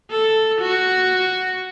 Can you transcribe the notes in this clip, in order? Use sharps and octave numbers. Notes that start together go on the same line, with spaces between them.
A4
F#4